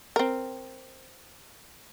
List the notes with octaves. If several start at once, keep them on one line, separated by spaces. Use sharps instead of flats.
C4 A#4